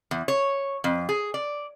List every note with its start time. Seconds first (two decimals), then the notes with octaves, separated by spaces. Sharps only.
0.11 E2
0.28 C#5
0.84 F2
1.09 G#4
1.34 D5